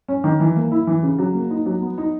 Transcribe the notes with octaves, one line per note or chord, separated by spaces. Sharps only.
C#4
D#3
E3
A#3
E4
E3
C#3
F#3
A#3
D#4
F#3
B3
D#4